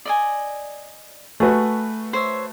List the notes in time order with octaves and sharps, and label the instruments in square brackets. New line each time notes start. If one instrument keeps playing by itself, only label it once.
[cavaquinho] D5 D#5 G#5
[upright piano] A3 F#4 B4 [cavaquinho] G#4
[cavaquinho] C5 C#5 E5